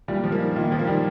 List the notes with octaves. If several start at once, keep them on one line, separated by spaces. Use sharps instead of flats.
A#2 G3
F3
A#3 D#4
A#2 D#3
F3
A#3
G3 D#4